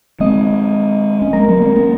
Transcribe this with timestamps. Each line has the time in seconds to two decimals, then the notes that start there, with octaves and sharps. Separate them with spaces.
0.20 G#3 C4 D#5
1.22 C#4
1.33 G#3 C4 A#4
1.48 F#3 A#3
1.62 G#3 C4
1.75 A#3 C#4